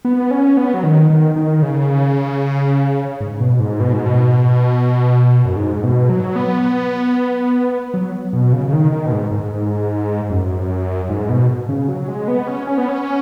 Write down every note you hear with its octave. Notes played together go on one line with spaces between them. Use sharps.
B3
C#4
B3
F#3
D#3
D#3
D#3
C#3
G#2
B2
G#2
B2
G#2
B2
F#2
G#2
B2
F#3
B3
F#3
B2
C#3
C#3
D#3
D#3
B2
G#2
G#2
F#2
G#2
B2
C#3
F#3
G#3
B3
C#4
C#4
B3
C#4